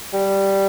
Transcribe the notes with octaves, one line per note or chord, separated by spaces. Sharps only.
G3